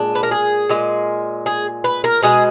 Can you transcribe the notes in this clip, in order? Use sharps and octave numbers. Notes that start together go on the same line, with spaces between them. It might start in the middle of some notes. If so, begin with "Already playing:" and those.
Already playing: A#2 G#3 D4
B4
A#4
G#4
A#2 G#3
G#4
B4
A#4
B2 G#3 G#4